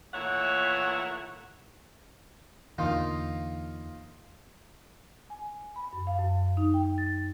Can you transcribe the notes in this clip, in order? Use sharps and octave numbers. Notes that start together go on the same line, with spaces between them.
A#2 E3 A3 E4 C#5 F#5
E2 D3 E3 A#3 D#4 F4
G#5
B5
F#2
F5
F#2
D#4
G5
A6